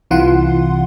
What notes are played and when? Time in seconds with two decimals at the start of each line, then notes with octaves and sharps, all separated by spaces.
0.11 C2 C3 E3 F4 F#5 C6